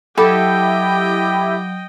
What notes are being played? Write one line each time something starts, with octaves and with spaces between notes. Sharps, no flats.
F#3 E4 G4 A4 D#5 G5